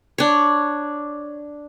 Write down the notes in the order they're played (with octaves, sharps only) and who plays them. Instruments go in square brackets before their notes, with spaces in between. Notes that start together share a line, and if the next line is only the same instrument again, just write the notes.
[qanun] D4 C#5